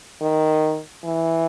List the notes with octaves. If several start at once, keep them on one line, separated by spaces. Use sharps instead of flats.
D#3
E3